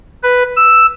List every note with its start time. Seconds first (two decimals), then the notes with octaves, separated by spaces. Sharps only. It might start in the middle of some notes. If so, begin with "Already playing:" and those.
0.23 B4
0.56 E6